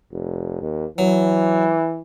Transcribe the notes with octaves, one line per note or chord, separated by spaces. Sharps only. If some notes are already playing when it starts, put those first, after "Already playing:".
F1
D#2
E3 F#3